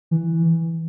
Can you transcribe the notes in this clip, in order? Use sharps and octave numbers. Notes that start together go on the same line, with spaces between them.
E3